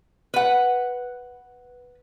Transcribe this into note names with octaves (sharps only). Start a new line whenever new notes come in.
B4 F#5